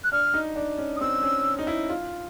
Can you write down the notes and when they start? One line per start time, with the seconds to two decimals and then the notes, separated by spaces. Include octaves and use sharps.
0.04 F#6
0.12 D4 F6
0.34 D#4
0.56 D4
0.78 C#4
0.96 D#6
1.01 C4 E6
1.23 C#4
1.59 D#4
1.67 E4
1.89 F4